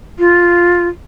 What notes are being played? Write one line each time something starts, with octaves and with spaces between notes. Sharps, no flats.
F4